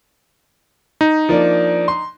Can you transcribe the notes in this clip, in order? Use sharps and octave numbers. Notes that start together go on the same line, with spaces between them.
D#4
F3 A#3 D4
C6